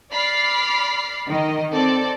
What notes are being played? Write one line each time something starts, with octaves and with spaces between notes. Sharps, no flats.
D5 B5 F6 C7
D#3 D#5
C4 A4 D5